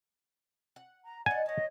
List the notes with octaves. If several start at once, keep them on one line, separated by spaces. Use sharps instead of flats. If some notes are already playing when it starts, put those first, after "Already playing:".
F#5
A#5
D#4 D5 D#5 F#5 G#5
C#5 D#5 F#5 A5